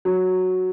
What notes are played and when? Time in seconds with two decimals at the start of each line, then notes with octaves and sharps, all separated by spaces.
0.05 F#3